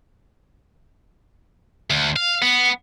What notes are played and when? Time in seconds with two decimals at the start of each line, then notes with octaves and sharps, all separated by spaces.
1.90 D2
2.16 F5
2.42 B3